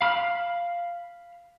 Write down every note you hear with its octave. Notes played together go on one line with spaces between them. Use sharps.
F5 B5 F6